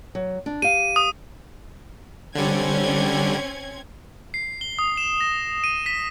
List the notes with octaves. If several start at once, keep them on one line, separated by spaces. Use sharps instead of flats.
F#3
D4
G4 F5 D#7
D#6
D3 G3 C4 C#4 G#6
C7
G7
D#6
E7
A#6
D#7
B6